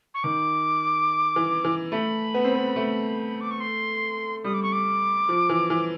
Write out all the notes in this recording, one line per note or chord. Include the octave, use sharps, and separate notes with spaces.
C#6
D#3 D6
E3
E3
A3 B5
B3
C4
B3
A3
D6
C#6
C6
G3 D#6
D6
C#6
D6
F3
E3
E3